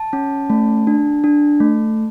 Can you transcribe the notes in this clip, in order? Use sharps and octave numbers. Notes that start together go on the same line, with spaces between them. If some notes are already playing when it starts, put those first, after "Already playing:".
Already playing: A5
C#4
A3
D4
D4
A3